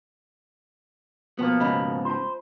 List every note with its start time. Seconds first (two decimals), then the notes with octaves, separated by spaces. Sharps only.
1.39 B2 F3 A#3 B3
1.60 G#2 C#3 B3 D#5 B5
2.05 F4 C5 F5 A5